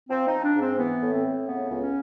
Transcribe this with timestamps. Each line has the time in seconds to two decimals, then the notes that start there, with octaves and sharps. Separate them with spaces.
0.09 F3 C4
0.27 D#4
0.32 F3
0.44 D4
0.56 G#2
0.61 C4
0.78 E3 B3
1.02 A2
1.12 C4
1.24 A2
1.47 C#3 B3
1.70 C#2
1.81 C#4